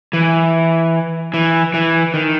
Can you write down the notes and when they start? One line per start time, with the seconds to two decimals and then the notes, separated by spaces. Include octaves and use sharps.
0.13 E3
1.34 E3
1.74 E3
2.14 D#3